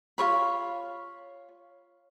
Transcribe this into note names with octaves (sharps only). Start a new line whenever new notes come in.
F4 A#4 C#5 B5